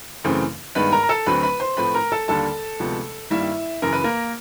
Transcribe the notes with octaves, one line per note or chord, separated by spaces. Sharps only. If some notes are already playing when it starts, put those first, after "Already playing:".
F#2 C#3 E3 A3 C4
G2 D#3 G#3 B3 B4 B5
A#4 A#5
A#5
A4 A5
D2 D3 F#3 A3 C4 B4 B5
B4 B5
C5 C6
A2 F3 A3 C4 B4 B5
A#4 A#5
A4 A5
D#2 D3 G3 A#3 A4 A5
D2 C3 F3 G#3 B3
G2 D#3 G3 A#3 E4 E5
F#2 C#3 E3 A#4
B4
A#3 A#4